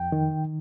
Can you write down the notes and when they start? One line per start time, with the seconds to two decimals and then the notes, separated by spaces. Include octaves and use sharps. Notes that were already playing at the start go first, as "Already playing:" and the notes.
Already playing: F2 G5
0.12 D#3